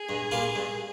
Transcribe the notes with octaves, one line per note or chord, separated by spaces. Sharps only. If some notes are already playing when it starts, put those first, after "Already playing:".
Already playing: G#4
G2
G3 A#3 F4
G2